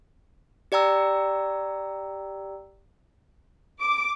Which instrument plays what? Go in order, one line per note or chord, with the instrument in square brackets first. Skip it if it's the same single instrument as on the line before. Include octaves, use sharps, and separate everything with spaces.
[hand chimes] G4 D5 G5 A#5 E6
[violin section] D6